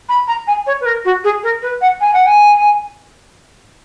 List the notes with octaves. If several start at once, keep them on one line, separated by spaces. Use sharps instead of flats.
B5
A#5
G#5
C#5
B4
A#4
F#4
G#4
A#4
B4
F#5
G#5
F#5
G#5